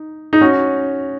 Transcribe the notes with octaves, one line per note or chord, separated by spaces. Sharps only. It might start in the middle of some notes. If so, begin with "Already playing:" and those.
Already playing: D#4
D#4
C#4 F#4